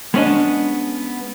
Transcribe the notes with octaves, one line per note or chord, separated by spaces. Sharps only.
G#3 B3 C#4 D4 D#5